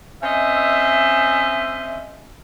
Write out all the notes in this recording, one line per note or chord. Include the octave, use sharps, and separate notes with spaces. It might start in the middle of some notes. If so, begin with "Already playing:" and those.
C4 C#4 D#5 E5